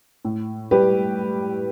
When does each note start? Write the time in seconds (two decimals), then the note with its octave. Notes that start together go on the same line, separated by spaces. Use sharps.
0.25 A2
0.71 G3 G4 B4